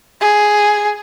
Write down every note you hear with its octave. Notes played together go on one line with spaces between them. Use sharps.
G#4